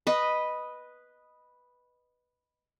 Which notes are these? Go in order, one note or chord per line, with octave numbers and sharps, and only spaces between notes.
B4 D#5